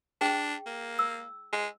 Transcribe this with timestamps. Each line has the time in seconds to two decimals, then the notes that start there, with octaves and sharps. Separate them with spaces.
0.21 D4 G#4 G5
0.66 A#3
0.99 E6
1.53 G#3